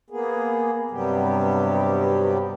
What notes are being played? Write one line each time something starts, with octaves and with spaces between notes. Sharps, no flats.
A#3 B3 G#4
G2 C3 F#3 G3 B3 G4